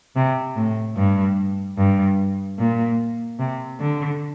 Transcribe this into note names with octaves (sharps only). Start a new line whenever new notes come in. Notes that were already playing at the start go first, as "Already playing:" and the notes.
C3
A2
G2
G2
A#2
C3
D3